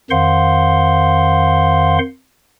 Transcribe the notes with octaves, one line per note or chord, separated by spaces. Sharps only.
F2 D#3 C5 F5 F#5 C6